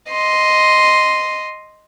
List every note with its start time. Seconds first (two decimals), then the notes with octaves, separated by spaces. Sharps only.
0.11 D#5 C6